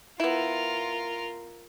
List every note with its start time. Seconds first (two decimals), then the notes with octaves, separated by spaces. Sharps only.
0.20 B3 E4 F4 A#4